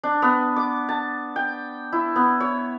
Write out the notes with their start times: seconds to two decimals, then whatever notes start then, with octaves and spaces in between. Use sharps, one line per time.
0.03 D4
0.22 B3
0.56 D6
0.89 A5
1.36 G5
1.92 E4
2.16 B3
2.40 C#5